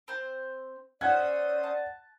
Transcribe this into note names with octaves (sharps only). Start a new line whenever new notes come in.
C4 C5
C#4 C5 D5 E5 F#5 D#6 F#6 G#6
A5